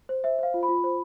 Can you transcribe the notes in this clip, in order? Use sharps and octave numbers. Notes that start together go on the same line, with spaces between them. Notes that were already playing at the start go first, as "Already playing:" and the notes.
C5
C5 E5
C5 F5
F4
B5
F4
C5